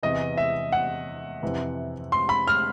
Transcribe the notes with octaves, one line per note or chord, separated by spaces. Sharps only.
E2 C3 E3 D#5
E5
F#5
F2 C3 E3
C6
B5
F6